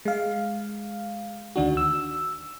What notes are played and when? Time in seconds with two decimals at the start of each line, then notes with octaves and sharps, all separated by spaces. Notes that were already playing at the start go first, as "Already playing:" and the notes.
0.05 G#3 F5
1.56 D2 D#3 D4 F#4
1.77 E6